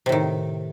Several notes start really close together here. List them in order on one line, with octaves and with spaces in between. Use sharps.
C3 A2 D#3